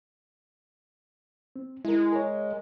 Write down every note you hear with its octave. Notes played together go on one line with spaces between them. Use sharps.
C4
G#3 E4 A#4
A#4 C#5